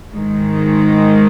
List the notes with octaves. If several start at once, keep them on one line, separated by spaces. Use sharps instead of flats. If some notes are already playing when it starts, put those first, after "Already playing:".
G#2 D#3 G#3